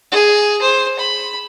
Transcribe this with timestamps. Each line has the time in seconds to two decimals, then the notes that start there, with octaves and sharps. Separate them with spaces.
0.12 G#4
0.61 C5
0.99 B5